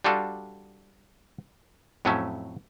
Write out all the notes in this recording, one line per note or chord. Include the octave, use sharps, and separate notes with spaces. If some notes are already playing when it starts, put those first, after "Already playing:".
G3 D4 F4 F#4 A4
F2 A2 F#3 A3 C#4 E5